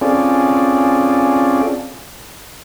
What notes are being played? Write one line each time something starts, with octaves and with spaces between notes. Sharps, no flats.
C4 C#4 F4 G#4 A4 D5